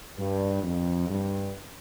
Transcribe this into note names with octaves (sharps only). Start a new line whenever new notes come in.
G2
F2
G2